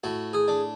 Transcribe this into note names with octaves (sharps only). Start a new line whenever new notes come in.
A2 F#4
G#4
D4